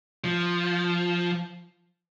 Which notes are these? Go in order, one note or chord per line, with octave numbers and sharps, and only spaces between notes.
F3